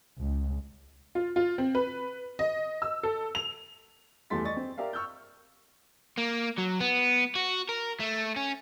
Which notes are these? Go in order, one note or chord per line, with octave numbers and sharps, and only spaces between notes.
C#2
F4
F4
C4
B4
D#5
E6
A4
F7
E2 G3 A3 C6 A6 B6
D5 D#5 C#6 A6
C4
G4 A#4 D5 E5 F5
C#6 E6 F6 G6
A#3
F#3
B3
F#4
A#4
A3
C#4